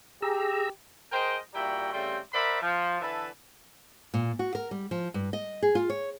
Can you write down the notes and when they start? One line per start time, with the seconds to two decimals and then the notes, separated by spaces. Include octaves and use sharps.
0.22 G4 G#4 A#5 E6
1.12 G#4 A#4 C5 D#5 G5
1.54 A#2 G3 E4 F#4 G5 A#5
1.93 C#3 G3 A3 C4 G5 C6
2.33 A#4 C5 D5 E5 F#5 B5
2.62 F3
3.01 D3 E3 B4 E5 A5
4.14 A#2
4.39 F#4
4.55 A#4
4.71 G3
4.91 F3
5.14 G2
5.33 D#5
5.63 G#4
5.75 F4
5.90 C#5